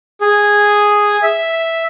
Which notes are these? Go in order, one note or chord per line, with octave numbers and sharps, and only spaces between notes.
G#4
E5